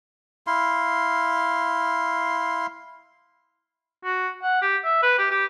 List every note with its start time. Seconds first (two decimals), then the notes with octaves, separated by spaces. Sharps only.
0.47 E4 F5 C6
4.04 F#4
4.43 F#5
4.62 G4
4.84 E5
5.02 B4
5.18 G4
5.31 G4